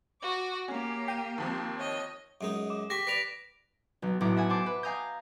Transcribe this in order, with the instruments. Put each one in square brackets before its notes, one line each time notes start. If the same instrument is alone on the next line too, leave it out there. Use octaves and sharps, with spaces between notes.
[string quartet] F#4 D6
[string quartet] A#3 G4 [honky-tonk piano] C#4
[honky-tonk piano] G5 D#7
D#2 F3 C4
[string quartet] C#5 D#5
[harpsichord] F#2 G#3 D#4
[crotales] D6
[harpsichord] G4 C#6 [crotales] A#6 B6
[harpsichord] B4 D5 [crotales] B6 D7 F7
[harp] B1
B1 A2 F#5 D6
E5 F#5 G#5
C5 A5 C6 D6
B4
F5 G#5 A#5 D#6 G6